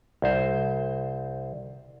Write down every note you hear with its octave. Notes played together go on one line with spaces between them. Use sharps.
C2 C5